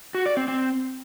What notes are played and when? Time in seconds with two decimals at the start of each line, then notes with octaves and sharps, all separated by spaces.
0.15 F#4
0.26 D5
0.37 C4
0.48 C4